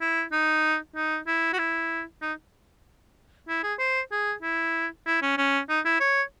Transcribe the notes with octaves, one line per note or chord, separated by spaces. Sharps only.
E4
D#4
D#4
E4
F#4
E4
D#4
E4
G#4
C5
G#4
E4
E4
C#4
C#4
D#4
E4
C#5